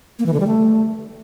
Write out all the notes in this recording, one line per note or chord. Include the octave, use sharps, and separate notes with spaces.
A#3
E3
D3
G3
A3